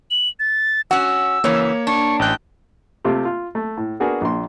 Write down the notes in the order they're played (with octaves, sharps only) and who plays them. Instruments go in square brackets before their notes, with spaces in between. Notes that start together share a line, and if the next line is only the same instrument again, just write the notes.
[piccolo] F#7
A6
[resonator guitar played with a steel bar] C#4 F#4 [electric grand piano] F#5 [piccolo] E6
[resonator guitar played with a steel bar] C#3 E3 [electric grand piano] A#3 C#5
[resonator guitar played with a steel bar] D4 [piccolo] C#6
[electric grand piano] A1 F#6 [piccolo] G5
[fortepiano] C3 A3 F4 G4
F4
A3
A2
B3 D4 F#4 G#4 A#4
A#1 D4 C6